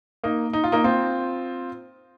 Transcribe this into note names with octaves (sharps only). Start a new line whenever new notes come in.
A#3 D#4
D#4
F4
A#3 D#4
C4 F4